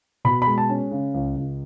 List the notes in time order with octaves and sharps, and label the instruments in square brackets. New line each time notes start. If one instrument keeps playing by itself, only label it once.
[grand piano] B2 B5
B5
G#3
A5
C#4
C#3
C#2
C#2